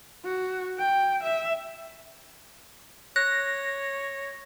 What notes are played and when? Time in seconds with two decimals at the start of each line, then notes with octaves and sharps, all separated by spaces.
0.25 F#4
0.78 G5
1.23 E5
3.16 C#5 F#6 A#6